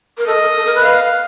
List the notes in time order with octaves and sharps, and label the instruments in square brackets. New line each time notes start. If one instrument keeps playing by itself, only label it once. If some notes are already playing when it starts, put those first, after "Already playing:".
[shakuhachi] A#4
[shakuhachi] A4 [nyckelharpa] D#5
[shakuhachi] A#4
A4
A#4
B4
[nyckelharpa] F5